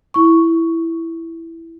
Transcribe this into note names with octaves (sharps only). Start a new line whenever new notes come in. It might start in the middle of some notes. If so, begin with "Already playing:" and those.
E4 C#6